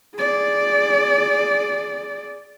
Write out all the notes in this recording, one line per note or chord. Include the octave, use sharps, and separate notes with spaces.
G#4 D5